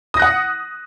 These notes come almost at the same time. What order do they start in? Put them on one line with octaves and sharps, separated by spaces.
D#6 A#6 F#6 F#5